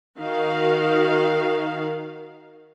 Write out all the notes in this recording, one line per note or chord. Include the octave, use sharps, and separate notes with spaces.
D#3 F#4 F5